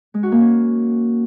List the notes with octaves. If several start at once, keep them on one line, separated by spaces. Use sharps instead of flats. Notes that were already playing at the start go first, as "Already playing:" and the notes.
G#3
F#4
A#3
C#4